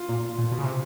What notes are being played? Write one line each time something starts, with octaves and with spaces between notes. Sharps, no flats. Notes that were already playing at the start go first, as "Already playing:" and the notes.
Already playing: F4
A#2
A#2
B2
C#3
C3